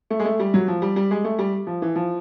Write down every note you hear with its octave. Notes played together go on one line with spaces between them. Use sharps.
A3
G#3
A3
G3
F#3
F3
G3
G3
G#3
A3
G3
F3
E3
F3